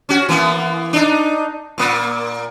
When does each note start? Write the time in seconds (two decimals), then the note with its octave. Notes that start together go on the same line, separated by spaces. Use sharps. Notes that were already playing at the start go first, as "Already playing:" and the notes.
0.09 C#4 F#4
0.29 E3 A#3 B3
0.93 D4 D#4
1.78 A#2 A#3